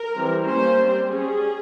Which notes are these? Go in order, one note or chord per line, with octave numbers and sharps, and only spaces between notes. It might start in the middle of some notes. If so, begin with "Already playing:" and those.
Already playing: A#4
E3 G3 C4
G3 A#3 C#4 C5
G3 C4
G3 C#4 G#4